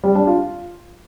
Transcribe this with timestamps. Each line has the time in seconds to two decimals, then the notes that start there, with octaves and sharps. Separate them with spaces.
0.04 G3
0.15 D4
0.27 F4